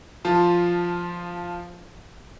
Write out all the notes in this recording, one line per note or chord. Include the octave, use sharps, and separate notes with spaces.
F3 F4 A5 C6